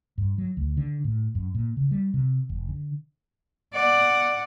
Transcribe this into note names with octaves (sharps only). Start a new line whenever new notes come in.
G2
F#3
D2
D3
A2
F#2
A#2
C#3
G3
C3
F1
D3
D5 F#5